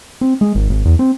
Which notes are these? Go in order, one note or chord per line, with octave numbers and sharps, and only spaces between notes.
C4
G#3
G#1
G#1
E2
C4